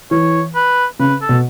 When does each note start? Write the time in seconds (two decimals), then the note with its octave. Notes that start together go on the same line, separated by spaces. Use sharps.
0.11 E3 C#5
0.55 B4
0.99 C#3 B4
1.22 A4
1.29 B2